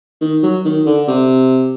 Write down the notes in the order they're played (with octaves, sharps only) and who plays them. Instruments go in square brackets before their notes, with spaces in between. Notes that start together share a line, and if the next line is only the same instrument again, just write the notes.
[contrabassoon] D#3
F#3
D#3
D3
C3